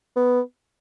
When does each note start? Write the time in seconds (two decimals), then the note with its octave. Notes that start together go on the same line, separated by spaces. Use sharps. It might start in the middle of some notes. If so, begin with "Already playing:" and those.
0.16 B3